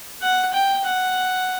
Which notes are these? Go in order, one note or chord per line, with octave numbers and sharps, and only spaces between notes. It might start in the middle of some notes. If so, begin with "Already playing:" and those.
F#5
G5
F#5